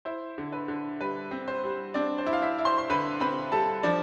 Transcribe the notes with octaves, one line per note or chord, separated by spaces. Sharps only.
E4 C5
D3
B4
D3
G3 B4
C4
C5
G3
C4 D4 D5
C5
E4
F5
E4 E5
E4
C5 C6
C6
D3 B4 B5
C4 B4 B5
G3 A4 A5
F3 D4 D5